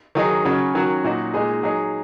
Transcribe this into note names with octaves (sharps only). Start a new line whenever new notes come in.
D#3 F#3 D#4 G#4
C#3 F#3 C#4 F#4
D#3 F#3 C#4 F#4
A#2 F#3 D#4 F#4
A#2 G#3 D#4 G#4
F#3 D#4 G#4